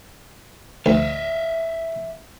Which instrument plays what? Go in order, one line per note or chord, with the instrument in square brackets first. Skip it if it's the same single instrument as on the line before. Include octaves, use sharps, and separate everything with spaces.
[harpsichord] D2 [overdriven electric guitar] E5 F5